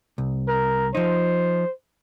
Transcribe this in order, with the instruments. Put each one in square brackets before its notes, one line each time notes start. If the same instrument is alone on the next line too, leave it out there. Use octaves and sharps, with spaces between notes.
[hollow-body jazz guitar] C2
[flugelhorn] A#4
[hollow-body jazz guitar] F3 D#4 [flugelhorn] C5